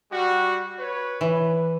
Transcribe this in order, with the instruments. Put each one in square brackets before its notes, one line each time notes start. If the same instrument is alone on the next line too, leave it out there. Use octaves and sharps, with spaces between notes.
[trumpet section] G3 F#4
B4 C#5
[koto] E3